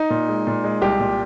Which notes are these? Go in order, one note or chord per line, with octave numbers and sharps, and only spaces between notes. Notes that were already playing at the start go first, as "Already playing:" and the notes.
Already playing: D#4
A#2
G#3
A#2
G#3
C2 G4
A#2